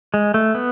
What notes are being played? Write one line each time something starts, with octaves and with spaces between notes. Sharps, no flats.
G#3
A3
B3